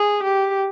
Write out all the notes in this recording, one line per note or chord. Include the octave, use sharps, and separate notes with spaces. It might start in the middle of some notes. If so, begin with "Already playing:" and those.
Already playing: G#4
G4